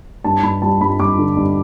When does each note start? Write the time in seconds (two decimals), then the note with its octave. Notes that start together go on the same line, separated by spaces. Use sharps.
0.24 G2 A5
0.43 G2 B5
0.62 G3 A5
0.81 G2 B5
0.99 G2 D6
1.19 D3
1.37 G2